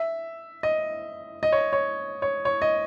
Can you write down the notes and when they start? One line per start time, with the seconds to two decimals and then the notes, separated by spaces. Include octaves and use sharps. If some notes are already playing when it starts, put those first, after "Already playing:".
Already playing: E5
0.63 D#5
1.43 D#5
1.52 C#5
1.73 C#5
2.22 C#5
2.45 C#5
2.62 D#5